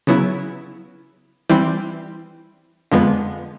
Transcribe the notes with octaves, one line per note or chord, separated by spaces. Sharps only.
C#3 F#3 B3 E4
E3 G3 C4 E4
F2 D3 F3 G#3 B3